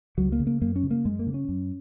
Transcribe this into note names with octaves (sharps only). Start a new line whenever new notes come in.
C#2 F#3
A#3
C#3
A#3
F#2 A#3
C#4
C#3
A#3
F#2 G#3
A#3
C#3
C#4
F#2